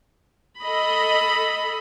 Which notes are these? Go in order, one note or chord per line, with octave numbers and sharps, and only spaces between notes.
A4 D#5 B5